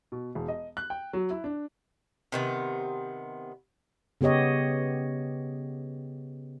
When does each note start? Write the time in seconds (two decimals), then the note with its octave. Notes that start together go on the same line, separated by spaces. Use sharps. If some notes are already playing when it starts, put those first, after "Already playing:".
0.12 B2
0.35 E1
0.48 D#5
0.77 F#6
0.90 G5
1.13 F#3
1.30 E4
1.44 D4
2.32 C3 D#3 B3
4.21 C#3 B3 G4 C#5 D#5